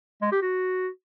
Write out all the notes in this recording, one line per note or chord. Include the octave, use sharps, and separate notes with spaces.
G#3
G4
F#4